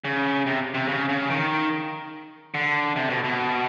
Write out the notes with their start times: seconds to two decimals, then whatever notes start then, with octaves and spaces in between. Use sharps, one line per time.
0.05 C#3
0.46 C3
0.74 C3
0.88 C#3
1.09 C#3
1.30 D#3
2.54 D3
2.96 C3
3.10 B2
3.24 B2